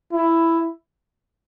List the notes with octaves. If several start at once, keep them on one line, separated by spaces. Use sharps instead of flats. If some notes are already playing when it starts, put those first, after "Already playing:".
E4